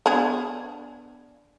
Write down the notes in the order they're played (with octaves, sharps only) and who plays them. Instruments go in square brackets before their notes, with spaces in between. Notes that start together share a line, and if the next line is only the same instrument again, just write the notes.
[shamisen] B3 D4 G#4